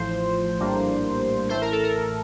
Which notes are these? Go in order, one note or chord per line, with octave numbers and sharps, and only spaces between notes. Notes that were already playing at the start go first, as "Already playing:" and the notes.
Already playing: A1 A2 F3 C5
A#1 A2 G3 A#3 D4
A1 A2 A3 C5
A#4
A4
A#4